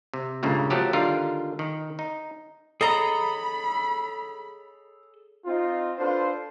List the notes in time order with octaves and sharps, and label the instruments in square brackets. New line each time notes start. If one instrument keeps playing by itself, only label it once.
[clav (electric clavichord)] C3
C#2 G2 A#2 C#3 A3 A#3
F3 F#3 A3 G4 A#4
D3 D#3 G3 F4 A#4
D#3
D#4
[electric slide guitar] G#4 A4 C#5 [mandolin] D#5 A#5 [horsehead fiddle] B5
[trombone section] C4 D#4 F4
D4 F4 A4 B4 C5